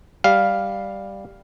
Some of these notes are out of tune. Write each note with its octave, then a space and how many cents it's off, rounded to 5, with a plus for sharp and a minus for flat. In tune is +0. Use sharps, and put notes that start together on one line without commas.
G3 +0 F5 +0